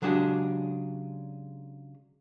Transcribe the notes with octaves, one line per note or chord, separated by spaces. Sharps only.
C#3 F#3 G#3 D4 G4 G#4